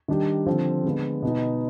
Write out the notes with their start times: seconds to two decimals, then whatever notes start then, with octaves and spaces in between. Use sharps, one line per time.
0.08 D#3 G3 D4 G4
0.46 D3 F3 C4
0.84 D3 G#3 B3
1.22 B2 B3 D#4